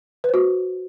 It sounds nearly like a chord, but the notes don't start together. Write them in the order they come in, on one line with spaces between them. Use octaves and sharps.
B4 C5 F#4